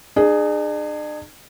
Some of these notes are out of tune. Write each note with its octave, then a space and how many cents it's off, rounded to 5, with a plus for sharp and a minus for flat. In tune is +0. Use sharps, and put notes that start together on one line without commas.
D4 +45 G#4 +0